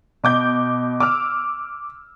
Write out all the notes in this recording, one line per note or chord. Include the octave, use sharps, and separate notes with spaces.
B2 D6 G6
D6 E6 F6